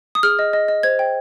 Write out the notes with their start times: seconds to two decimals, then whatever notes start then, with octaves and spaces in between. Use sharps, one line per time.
0.15 D#6
0.23 G#4 F6
0.39 D#5
0.53 D#5
0.68 D#5
0.83 C5 G#6
0.99 G5